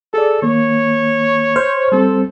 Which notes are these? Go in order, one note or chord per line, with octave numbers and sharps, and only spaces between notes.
G#4 A4 D5
D#3 A#3 C#5
C5 F6
G3 C4 A4